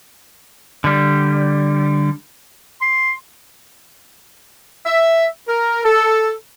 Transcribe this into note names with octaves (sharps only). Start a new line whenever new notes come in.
D3 G3
C6
E5
A#4
A4